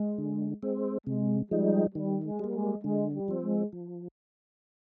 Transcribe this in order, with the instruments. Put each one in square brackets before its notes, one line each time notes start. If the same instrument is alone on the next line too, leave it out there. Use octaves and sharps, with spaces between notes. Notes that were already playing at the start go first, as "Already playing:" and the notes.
Already playing: [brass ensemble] G#3
[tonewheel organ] D3
G#3 C4
[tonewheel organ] C3 [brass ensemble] G#3
[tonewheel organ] F3 G#3 D#4 [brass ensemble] G3
[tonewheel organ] D#3 [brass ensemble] G3
[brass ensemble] G#3
[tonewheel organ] G3 A#3
[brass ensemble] G#3
[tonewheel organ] D3 [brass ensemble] G#3
[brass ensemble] G3
[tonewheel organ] F3 C4
[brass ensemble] G#3
[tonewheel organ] F3